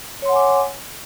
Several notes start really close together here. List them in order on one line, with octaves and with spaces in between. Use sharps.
C#5 C6 F#5 G#5 D6